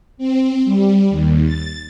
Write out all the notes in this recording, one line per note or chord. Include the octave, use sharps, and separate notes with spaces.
C4
G3
D#2
A6